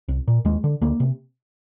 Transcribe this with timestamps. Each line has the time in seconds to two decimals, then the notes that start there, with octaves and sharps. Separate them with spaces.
0.08 C2
0.28 A#2
0.45 D#2 G#3
0.64 D3
0.82 D2 A#3
1.00 C3